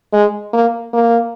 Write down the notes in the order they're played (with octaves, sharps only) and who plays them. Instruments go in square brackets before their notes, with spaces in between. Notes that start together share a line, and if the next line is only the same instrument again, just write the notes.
[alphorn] G#3
A#3
A#3